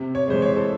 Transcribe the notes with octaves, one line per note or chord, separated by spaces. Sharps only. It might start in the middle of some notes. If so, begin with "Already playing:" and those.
Already playing: C3
C#5
E3 G#3 C5
C#5
A4